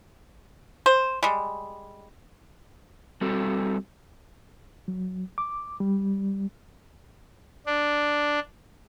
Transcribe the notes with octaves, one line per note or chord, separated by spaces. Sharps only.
C5
G3 G#3
G3 C4 F#4 A4
F#3
D6
G3
D4